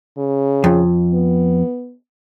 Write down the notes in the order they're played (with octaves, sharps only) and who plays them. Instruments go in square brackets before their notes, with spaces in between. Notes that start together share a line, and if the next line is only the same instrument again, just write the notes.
[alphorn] C#3
[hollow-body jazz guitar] F2
[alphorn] B3